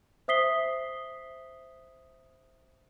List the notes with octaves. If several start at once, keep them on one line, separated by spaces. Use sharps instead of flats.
C5 E5 D#6 B6 C7 G7